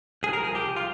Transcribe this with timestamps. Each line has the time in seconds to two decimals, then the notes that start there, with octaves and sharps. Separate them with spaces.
0.23 C2 G#4
0.33 A#4
0.39 F3
0.44 G#4
0.55 C2 G4
0.76 F4